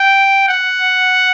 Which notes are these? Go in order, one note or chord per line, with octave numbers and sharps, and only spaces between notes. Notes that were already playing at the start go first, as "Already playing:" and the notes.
Already playing: G5
F#5